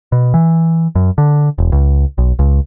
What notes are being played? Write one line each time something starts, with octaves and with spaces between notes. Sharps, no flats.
B2
E3
F#2
D3
E1
C#2
B1
C#2